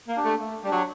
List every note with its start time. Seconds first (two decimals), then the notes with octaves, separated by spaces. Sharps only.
0.08 A#3
0.16 D4 G4
0.23 A3
0.40 A3
0.63 G3 G4
0.67 F#3 D4